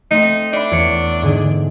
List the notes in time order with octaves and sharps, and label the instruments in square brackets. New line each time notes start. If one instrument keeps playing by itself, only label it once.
[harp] A3 C4 [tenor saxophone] D#4
[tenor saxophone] D4 [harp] E5 B5
[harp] E2 C#5 C#7
G#2 D3 G#4